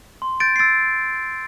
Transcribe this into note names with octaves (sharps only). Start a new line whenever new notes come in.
C6
G6 A6 D7
C7
E6 A6 D7